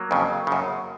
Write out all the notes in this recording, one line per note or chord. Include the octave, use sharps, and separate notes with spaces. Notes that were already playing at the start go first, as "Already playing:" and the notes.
Already playing: F#3 A#3
F2 C#3
F#2 C#3